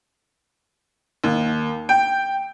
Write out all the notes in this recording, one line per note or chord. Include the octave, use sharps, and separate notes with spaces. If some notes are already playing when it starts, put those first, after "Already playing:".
D#2
G5